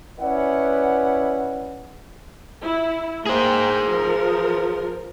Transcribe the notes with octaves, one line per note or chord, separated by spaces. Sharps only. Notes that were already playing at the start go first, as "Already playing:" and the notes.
C#4 E4 B4 D5 F#5
E4
A#3 G#4 C5 G5
F3 A#4